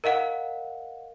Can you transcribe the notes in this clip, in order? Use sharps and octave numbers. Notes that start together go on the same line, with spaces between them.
A#4 D#5 F5 F#5